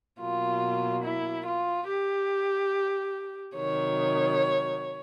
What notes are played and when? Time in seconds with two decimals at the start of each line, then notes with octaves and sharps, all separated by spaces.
0.20 B2 F#3 A#3 F4
1.03 E4
1.46 F4
1.88 G4
3.55 C3 D#3 F#3 C#5